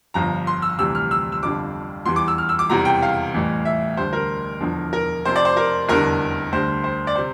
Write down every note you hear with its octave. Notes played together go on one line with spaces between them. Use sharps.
G1 G2 F3 A#5
C6
E6
D2 C3 E3 G3 E6
F6
E6
E6
G1 F2 D3 G3 D6
E2 E3 G3 C6
D6
E6
F6
E6
D6
E1 E2 C3 G3 A#5
G5
F5
A1 A2 E3 G3
E5
D2 D3 G3 C5
A#4
E1 E2 D3 F3
A#4
F1 F2 C3 C5
D5
C5
A#4
F1 E2 D3 G3 A#4
D2 D3 G3 C5
C5
D5
C3 C5